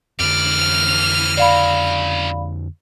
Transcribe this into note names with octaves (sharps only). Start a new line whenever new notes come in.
F2 D3 E3 D5 F6
C#3 F#3 D5 F5 B5